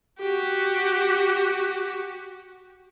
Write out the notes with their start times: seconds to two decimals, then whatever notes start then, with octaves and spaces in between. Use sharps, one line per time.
0.19 F#4 G4